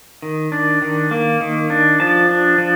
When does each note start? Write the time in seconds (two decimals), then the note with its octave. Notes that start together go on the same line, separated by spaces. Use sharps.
0.22 D#3
0.52 D4
0.82 D#3
1.11 A#3
1.41 D#3
1.70 D4
2.00 F3 A5
2.29 D4
2.58 F3